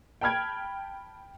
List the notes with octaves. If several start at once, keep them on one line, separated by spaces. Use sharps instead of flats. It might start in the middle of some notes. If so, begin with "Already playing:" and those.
G5 A5 B5 F6 G#6 D7